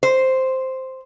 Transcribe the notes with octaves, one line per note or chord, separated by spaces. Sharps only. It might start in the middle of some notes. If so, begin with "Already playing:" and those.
C5